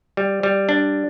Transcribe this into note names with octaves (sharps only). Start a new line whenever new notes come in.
G3
G3
D4